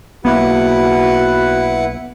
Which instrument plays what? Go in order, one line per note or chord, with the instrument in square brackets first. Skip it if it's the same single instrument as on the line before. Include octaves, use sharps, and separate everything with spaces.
[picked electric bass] B1 A#3 B3 [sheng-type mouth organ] E4 B4 F#5 [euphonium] F#4